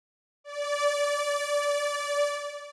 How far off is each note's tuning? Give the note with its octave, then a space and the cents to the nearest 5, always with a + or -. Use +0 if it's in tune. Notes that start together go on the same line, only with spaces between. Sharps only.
D5 -20